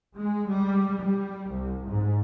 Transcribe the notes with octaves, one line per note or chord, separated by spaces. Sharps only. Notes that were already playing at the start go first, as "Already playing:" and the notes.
G#3
G3
G3
C2
G#2